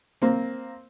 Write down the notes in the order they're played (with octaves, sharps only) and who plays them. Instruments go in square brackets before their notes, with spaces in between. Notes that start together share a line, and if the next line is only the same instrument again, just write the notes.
[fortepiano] A#3 C4